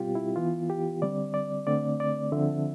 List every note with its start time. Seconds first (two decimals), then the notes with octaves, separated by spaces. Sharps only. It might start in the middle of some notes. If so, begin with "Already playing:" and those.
Already playing: B2 G3 C4 F4 G4
0.15 E4
0.36 E3 B3 F4
0.70 G4
1.02 D3 G3 C4 D5
1.34 D5
1.67 D3 A3 C4 D5
2.00 D5
2.32 D3 F3 C4 E5